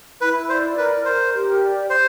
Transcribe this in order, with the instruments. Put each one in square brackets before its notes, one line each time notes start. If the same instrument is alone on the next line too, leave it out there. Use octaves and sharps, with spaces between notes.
[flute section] E4 [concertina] B4
[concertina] C5 [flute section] D5
[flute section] A#4 [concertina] B4
[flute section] A#4 [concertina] C5
[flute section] G4
D5
[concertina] C5 [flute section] D5